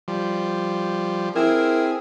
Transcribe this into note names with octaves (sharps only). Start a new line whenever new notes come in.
F3 G3
C4 E4 G#4 A#4